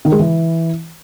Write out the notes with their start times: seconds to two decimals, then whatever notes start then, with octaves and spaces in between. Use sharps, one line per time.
0.05 D#3
0.12 G#3
0.19 E3